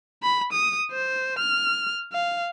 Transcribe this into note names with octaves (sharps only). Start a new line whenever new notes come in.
B5
D#6
C5
F6
F5